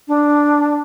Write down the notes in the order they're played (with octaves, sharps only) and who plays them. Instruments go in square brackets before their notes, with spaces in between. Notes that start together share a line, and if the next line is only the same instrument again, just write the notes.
[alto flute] D4